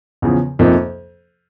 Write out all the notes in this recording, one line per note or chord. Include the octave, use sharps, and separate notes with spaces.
E2 C#3 F3
F2 C3 F3 A#3 D#4